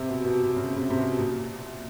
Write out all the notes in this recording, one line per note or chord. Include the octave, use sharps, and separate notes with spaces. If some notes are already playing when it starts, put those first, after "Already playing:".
Already playing: C3
B2
B2
B2
C#3
C3
C3
B2
A#2